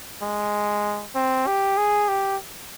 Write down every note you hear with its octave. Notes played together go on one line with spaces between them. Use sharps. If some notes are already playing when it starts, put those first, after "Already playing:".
G#3
C4
G4
G#4
G4